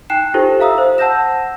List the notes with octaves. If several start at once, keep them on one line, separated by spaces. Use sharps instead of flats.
D#4 G5 G#5 F#6 C7 E7
D#4 F4 G4 A4 C5
E5 F5 A#5 D#6 E6
C5
F#5 A5 E6 G6 A#6 E7